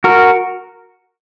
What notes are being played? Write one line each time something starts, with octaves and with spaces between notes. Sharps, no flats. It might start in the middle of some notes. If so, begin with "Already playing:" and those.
F#4 A#4